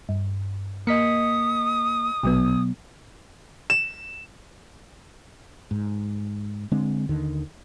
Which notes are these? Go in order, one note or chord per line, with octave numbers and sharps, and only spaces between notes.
G2
A#3 D#5 D#6 B6 C#7
A#1 B2 F#3 B3
E7
G#2
D3 G#3 C4 D4
D#2 D3 D#3